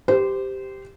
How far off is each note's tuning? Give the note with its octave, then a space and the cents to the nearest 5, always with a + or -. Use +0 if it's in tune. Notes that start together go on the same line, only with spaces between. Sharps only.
G4 +0 C5 -20